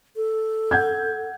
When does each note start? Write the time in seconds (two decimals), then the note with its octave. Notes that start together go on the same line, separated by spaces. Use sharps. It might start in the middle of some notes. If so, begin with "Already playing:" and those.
0.16 A4
0.71 F#5 G6 G#6